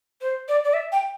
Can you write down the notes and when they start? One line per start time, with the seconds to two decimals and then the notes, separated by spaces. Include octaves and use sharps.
0.21 C5
0.49 D5
0.64 D5
0.74 E5
0.92 G5